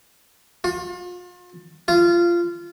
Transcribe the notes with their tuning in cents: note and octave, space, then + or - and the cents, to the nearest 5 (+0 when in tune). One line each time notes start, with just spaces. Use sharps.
F4 +35
F4 -20